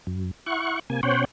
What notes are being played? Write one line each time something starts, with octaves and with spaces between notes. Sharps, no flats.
F#2
E4 F#5 C#6
C3 A#3 G#5
B2 C#4 C5 C#5 F#5 G5